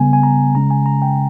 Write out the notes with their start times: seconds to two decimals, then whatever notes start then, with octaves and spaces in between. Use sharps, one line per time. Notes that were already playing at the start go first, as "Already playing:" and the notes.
Already playing: C#3 G3 B3 G#5
0.13 G#5
0.23 A#5
0.55 C#3 G#3 C#4 A#5
0.71 G#5
0.86 A#5
1.02 G5